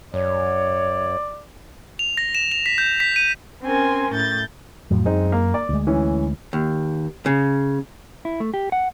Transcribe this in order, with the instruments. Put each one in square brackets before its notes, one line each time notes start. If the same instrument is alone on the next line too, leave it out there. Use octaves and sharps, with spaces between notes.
[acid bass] F#2 [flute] C#5 [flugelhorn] D5
[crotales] F7
A#6
E7
F7
B6
G6
B6
D#7
[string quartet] C4 C#4 A#4 G#5 C6
A2 G6 A6
[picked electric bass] F2 A2 F#3
[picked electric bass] F#2 [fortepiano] G#3 C4 D#4
[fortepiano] A#3
D5
[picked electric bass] D2 G#3
[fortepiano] E3 C#4
[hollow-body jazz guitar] D#2
C#3
[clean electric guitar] E4
A3
G4
F#5